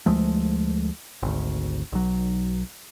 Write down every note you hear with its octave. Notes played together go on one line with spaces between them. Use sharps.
D2 F3 G#3 A3
G#1 D2
B1 F#3